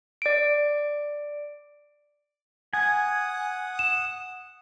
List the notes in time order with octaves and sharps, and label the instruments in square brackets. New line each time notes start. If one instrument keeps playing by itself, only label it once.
[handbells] D5 D7
[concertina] F#5 D#6 [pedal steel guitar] G#5
[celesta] E7